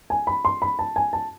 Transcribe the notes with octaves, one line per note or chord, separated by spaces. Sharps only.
G#5
B5
C6
B5
A5
G#5
A5